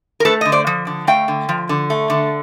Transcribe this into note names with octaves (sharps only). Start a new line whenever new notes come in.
A#4
A3 A4 B4
D3 D#5
C5 D5
F3
D3
A3 F5 G5
D3
F3
D3
A3
D3